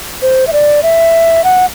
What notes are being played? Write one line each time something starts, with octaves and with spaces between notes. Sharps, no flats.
C5
E5
D5
E5
F#5